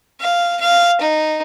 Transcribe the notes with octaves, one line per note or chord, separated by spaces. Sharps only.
F5
F5
D#4